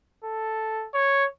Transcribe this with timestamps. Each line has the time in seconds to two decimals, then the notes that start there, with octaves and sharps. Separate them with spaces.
0.24 A4
0.94 C#5